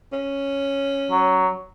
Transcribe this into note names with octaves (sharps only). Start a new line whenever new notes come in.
C#4
F#3